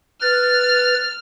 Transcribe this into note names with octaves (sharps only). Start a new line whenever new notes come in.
B4 F6 A6